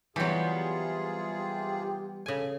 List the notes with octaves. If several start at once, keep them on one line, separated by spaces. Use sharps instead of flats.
C3 E3 F#3 G3 B3 F4 G#4
G4
C#3 A4 G#5